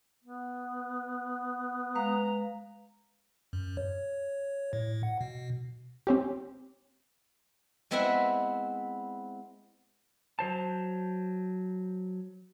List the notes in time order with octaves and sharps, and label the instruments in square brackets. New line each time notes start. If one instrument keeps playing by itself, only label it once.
[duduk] B3
[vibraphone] G#3 B4 F5 [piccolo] A#5
[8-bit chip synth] F#2
C#5
A2
F#5
B2
[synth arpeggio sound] C4 C#4 G4
[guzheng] G#3 B3 C4 E4 E5 F#5
[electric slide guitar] F#3 C5 A5